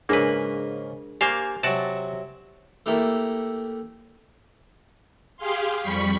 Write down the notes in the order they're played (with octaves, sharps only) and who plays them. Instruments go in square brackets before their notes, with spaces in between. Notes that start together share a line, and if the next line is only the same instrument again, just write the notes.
[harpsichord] G#2 C#3 [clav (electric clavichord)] A#3 B4 [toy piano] D4 G#4 A#4
[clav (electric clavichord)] A#3 C5 F5 [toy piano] G4 G#5 [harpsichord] D5 C#6
[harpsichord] C3 F#3 [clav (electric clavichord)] F#4 D5 A5
[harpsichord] A3 A#3 E4 G4 A4 A#4
[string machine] G4 G#4 F5 C6
F2 G3 B5 C#6 B6